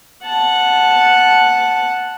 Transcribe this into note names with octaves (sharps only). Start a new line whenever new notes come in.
F#5 A5